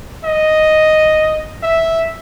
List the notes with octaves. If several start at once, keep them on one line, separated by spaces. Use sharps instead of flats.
D#5
E5